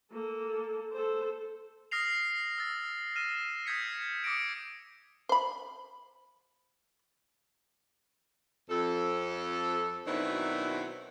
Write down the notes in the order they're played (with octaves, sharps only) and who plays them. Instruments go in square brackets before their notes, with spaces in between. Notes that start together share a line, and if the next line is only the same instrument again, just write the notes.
[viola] A#3 A4
A4 C5
[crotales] D#6 F6 A#6 C7 F7
E6 A6
F6 A#6 D#7 E7
D#6 G6 G#6 B6 C#7
D6 D#6 A#6 C#7 D7
[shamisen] C5 B5
[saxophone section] F2 A4
B2 D#3 F#3 C4 D4 E4